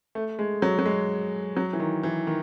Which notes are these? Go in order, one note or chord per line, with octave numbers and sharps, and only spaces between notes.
A3
G#3
F#3
F#3
G#3
F#3
E3
D#3
E3
D#3